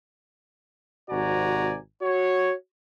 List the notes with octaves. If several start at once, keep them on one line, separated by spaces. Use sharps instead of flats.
G#1 C3 F#4 D5 G#5 A#5
F#4 C#5